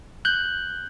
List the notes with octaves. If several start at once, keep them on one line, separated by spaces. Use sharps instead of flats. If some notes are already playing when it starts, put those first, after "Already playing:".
F#6 G6